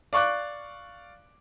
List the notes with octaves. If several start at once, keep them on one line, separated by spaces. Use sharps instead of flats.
D5 F5 C#6 D6 F#6